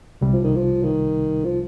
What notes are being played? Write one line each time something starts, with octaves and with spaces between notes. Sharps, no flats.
C2 C3 G3
F3
D#3
F3
D#3
F3